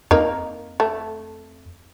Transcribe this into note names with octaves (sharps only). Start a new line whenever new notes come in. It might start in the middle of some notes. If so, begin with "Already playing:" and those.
F2 A#3 D#4
A3